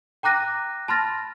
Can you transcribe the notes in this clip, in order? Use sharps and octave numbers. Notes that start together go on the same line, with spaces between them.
G5 A#5 D6 F#6 A#6 D#7
A5 B5 C6 F6 A6 A#6